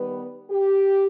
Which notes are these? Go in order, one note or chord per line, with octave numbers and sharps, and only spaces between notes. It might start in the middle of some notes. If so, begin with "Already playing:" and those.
Already playing: D#3 G3 B3 B4
G4